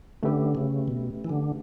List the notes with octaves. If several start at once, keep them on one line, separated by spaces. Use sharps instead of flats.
D3 A3 C#4 G4 B4 E5
C#3
B2
E3
D3